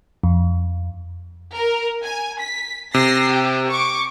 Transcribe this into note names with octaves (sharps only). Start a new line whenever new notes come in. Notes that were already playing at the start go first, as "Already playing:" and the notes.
F2
A#4
G#5
B6
C3 A#6 C7
G4
C#6 D6